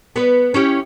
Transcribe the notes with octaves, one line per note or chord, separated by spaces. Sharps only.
B3 B4
C#4 E4 G4